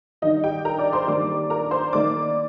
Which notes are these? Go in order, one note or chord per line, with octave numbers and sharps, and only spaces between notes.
D#3 G3 D4 D#4 D#5
G4 G5
A#4 A#5
D5 D6
C5 C6
D#3 G3 A#3 D4 D5 D6
A#4 A#5
C5 C6
D#3 A#3 D#4 D5 D6